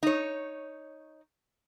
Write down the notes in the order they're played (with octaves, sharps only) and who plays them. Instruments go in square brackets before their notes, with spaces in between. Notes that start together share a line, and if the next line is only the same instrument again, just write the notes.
[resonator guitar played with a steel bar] D#4 C#5